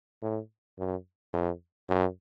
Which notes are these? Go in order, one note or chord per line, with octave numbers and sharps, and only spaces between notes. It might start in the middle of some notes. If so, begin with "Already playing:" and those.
A2
F#2
F2
F#2